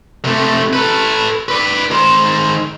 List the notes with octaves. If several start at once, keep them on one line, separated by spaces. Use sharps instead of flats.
C3 A3
A4 B4
B4 D5
D#3 C5